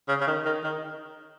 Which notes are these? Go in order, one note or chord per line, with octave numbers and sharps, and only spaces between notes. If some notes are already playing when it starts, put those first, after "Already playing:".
C#3
C#3
D#3
D#3
D#3